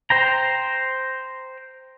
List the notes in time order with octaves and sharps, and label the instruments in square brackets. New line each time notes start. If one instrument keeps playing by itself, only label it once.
[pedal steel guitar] C5 G5 A#5